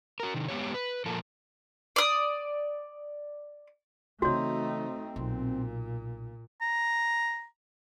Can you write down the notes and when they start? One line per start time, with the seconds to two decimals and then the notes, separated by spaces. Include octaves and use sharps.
0.20 F#4 A#4
0.34 C3 D#3
0.49 G#3 B3 G4 C#5
0.74 B4
1.06 A#2 F3 A4 A#4
1.96 D5 D#6
4.22 C#3 E3 A3 C4 D#4 F#4 C#5
5.16 B1 A#2
6.61 A#5